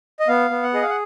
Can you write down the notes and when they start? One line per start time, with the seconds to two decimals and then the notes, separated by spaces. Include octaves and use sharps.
0.20 D#5
0.28 B3 F5
0.51 B3
0.63 F#5
0.74 G#4 D#5
0.82 F5
0.89 F#5